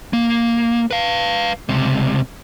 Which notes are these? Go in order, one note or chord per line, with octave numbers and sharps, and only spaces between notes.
A#3
B4 F5
C#2 C3